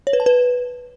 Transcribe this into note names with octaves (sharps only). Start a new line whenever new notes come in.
C#5
B4
A5
B4